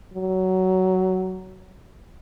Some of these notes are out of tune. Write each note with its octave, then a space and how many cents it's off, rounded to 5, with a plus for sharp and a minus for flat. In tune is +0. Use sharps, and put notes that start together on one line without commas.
F#3 +15